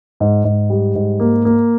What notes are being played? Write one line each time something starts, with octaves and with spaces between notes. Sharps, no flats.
G#2
G#2
G3
G#2
A#3
A#3